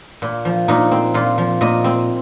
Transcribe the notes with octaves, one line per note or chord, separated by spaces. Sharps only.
A#2
F3
A#2 D#4
C4
A#2 F4
F3
A#2 D#5
C4